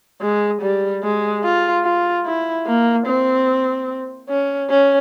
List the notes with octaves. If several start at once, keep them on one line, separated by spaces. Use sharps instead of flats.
G#3
G3
G#3
F4
F4
E4
A#3
C4
C#4
C#4